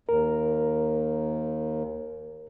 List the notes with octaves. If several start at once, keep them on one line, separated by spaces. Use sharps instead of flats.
D#2 A#4